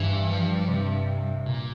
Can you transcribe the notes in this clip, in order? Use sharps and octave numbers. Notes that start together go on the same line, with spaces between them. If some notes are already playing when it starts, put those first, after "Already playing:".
Already playing: G2 E3
F3
C3
A#2